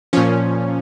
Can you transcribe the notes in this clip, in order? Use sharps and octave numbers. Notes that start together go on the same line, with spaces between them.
A#2 F3 C#4